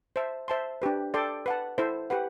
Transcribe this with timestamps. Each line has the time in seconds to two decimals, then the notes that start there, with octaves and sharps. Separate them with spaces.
0.16 C5 E5 A5
0.48 C5 E5 A5 C6
0.82 D4 G4 B4
1.14 A4 D5 G5 C6
1.46 B4 F#5 A5
1.78 E4 A4 C5 E5
2.10 G4 B4 F#5